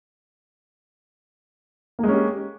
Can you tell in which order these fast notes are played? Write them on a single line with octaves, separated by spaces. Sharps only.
A#3 G#3 C#4 G4